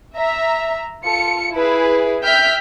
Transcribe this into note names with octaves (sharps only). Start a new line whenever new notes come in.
E5 A#5
F4 A4 C#7
E4 G#4 B4
E5 G5 F6 G6 B6